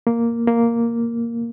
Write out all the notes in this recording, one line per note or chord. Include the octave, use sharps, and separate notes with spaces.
A#3
A#3